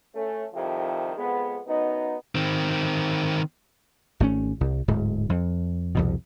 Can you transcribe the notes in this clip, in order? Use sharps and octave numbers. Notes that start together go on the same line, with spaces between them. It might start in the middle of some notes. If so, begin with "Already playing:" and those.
A3 C#4
C2 F2 C3 D#3 F3
F2 G#3 B3
F#2 B3 D#4
D#3 C4
G#1 A3 C#4
C2
D1 G#2
F2
C2 F2 B2